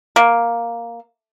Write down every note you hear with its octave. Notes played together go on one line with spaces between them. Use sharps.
A#3